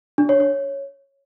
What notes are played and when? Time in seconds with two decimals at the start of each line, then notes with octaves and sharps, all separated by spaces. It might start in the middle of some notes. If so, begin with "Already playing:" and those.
0.18 D4
0.29 C#5
0.40 C#5